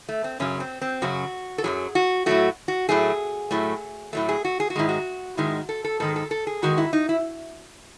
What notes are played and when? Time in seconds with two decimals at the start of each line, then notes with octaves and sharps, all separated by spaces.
0.09 A3
0.24 C4
0.40 F#2 C#3 F#3 C#4
0.60 C4
0.81 C4
1.02 F#2 C#3 F#3 F#4
1.58 A4
1.64 F#2 C#3 F#3 G#4
1.95 F#4
2.26 A2 F#3 A3 F#4
2.68 F#4
2.89 A2 F#3 A3 G#4
3.51 A2 F#3 A3
4.13 A2 F#3 A3 A4
4.29 G#4
4.44 F#4
4.60 G#4
4.70 F#4
4.76 G#2 D#3 G#3 E4
4.89 F#4
5.37 G#2 D#3 G#3 E4
5.69 A4
5.84 A4
6.00 G#2 D#3 G#3 A4
6.16 A4
6.31 A4
6.47 G#4
6.62 G#2 D#3 G#3 F#4
6.78 E4
6.93 D#4
7.09 E4